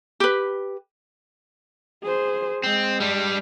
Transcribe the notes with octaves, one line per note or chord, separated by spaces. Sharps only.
G4 B4
G#4 C5
G#3 C4
G3 D4